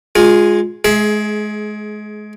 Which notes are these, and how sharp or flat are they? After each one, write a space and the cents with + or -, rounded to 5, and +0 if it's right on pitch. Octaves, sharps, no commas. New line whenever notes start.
G#3 +0 F4 +20 G#4 +0
G#3 +30 G#4 +15 E5 +0